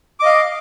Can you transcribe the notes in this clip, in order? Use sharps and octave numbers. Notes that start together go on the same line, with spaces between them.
D#5 F5 D6